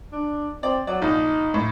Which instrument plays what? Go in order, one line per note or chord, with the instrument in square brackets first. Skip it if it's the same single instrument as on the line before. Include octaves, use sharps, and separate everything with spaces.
[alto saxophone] D4
[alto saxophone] C4 [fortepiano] D5
[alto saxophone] F#3 [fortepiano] D5
[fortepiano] A#1 [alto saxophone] D#4
[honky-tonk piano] A2